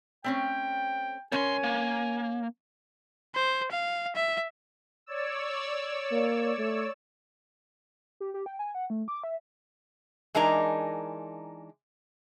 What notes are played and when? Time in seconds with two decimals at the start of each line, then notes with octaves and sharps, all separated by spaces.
0.24 A3 C4 C#4 G5
1.32 C#2 C#4 A#4 C#5 G#5 C6
1.64 A#3
3.35 C5
3.71 F5
4.15 E5
5.06 C#5 D5 E6
6.12 A#3
6.59 A3
8.20 G4
8.34 G4
8.46 G5
8.59 G#5
8.75 F#5
8.90 A3
9.08 D6
9.24 E5
10.35 E3 G#3 D4 D#4 A#4 A#5